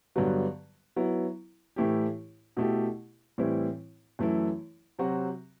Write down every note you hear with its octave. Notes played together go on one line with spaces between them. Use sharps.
G2 D3 F#3 B3
F#3 B3 E4
A2 E3 A3 E4 G4
B2 A3 E4 G4
A2 E3 G3 C4 E4
F#2 E3 A3 E4
C3 F#3 C4 F#4